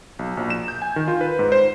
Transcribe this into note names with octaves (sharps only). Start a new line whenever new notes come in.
B1
A#1
E7
G6
G#5
D#3
F4
B4
G#2
C5